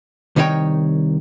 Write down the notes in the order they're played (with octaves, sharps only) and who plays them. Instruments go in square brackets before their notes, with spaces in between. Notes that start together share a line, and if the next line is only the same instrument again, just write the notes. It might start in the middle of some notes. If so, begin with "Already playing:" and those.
[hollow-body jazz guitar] C2 D#3 D#4 F#4 C#5 G5